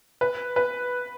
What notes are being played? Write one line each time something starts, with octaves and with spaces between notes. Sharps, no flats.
B4
B4